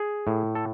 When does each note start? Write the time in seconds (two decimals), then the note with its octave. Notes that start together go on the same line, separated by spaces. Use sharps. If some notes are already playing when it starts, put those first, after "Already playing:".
Already playing: G#4
0.27 A2
0.55 A4